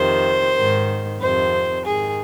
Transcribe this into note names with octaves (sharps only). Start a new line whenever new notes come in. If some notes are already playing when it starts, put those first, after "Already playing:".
Already playing: F2 C3 D#3 C5
G#2 D#3
F2 C3 D#3 C5
G#2 D#3 G#4